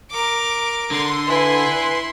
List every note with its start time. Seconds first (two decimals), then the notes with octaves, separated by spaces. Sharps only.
0.11 A#4 D6
0.91 D3 C6
1.27 E4 B4 G#5